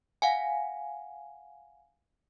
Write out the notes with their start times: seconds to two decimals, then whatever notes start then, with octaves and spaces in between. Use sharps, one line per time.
0.22 F5 F#5 G#5